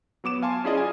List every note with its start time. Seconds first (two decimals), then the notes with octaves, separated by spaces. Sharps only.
0.24 F#3 B3 D6 E7
0.42 F5 G#5 A5 C6
0.64 C#4 E4 F4 G#4 D5 D#5
0.77 F5 G#5